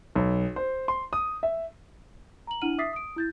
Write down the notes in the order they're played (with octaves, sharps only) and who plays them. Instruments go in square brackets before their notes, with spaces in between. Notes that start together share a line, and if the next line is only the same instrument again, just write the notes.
[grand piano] B1
C5
C6
D#6
E5
[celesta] A#5 F#7
D4 E4 F#5 F6 D#7 F#7
E5 D6 D#6 A6 B6 C7
D#6 D7
E4 G6 A6